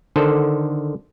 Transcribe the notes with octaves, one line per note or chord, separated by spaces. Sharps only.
D3 D#3 A4 C5